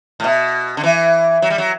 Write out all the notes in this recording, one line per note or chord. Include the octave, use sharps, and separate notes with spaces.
A2
B2
D3
E3
F#3
G3
F#3